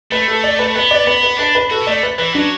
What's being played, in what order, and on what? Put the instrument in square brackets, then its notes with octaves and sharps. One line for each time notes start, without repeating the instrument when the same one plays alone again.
[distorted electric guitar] A3 [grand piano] B4
[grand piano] A4
D5
B4
[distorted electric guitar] B3 [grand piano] B4
[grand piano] D5
[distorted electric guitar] B3 [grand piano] B4
[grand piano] B4
[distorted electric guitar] D4 [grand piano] B4
[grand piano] B4
[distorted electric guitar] F#4 [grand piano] A4
[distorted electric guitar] B3
[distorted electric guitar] A3 [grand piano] D5
[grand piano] B4
[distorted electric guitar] E3 [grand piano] B4
[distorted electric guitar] F#3 [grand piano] D4